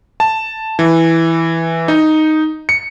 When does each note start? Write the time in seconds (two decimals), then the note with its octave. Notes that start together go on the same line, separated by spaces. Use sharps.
0.20 A5
0.79 E3
1.88 D#4
2.69 C#7